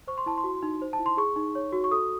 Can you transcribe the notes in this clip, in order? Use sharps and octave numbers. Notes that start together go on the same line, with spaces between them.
C5 C#6
C6
E4 A5
C6
F#4
D#4
C5
A5
E4
C6
G#4 C#6
D#4
C#5
F#4
C#6
A4 D#6